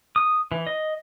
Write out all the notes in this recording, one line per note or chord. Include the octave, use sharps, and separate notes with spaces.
D#6
E3
D#5